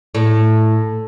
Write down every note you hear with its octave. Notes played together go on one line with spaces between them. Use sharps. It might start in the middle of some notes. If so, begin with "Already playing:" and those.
A2